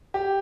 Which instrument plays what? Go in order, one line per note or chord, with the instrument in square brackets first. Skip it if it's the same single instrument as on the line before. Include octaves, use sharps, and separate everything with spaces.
[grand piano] G4